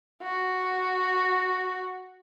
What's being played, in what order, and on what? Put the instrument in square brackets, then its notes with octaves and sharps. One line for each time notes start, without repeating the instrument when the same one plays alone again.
[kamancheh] F#4